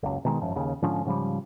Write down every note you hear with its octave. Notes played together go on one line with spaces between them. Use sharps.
F#1 C#2
B2 D#3 G#3
G#1 F#2 F3
D#2 C#3
G#2 D3 F3 C#4
G#2 C#3 F3 G3